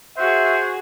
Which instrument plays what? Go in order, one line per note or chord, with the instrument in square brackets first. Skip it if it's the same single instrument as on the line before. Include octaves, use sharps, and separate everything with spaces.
[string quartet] F#4 G#4 [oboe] C5 [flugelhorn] E5